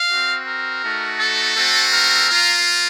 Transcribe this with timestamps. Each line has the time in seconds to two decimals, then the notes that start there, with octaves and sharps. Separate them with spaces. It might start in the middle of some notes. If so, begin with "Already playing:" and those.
Already playing: F5
0.09 C4 F#4
0.46 A#4
0.83 A3 D#4 F#4
1.20 A4
1.55 A3 C4 F#4
1.93 A#4
2.30 A#3 F4